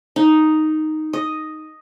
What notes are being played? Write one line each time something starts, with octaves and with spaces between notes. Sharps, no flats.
D#4
D#5